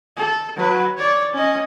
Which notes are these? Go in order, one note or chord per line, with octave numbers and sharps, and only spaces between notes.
A4
F#3 B4
C#5 D5
C#4 D#5